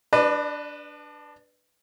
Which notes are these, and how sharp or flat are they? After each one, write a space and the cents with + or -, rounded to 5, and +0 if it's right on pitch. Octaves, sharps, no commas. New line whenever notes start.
D4 +0 B4 +0 D5 +45